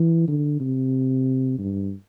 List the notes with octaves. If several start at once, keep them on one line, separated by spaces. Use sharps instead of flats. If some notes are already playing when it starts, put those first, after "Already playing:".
Already playing: E3
D3
C3
G2